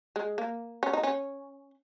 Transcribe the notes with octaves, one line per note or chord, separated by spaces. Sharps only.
G#3
A#3
C#4
D#4
C#4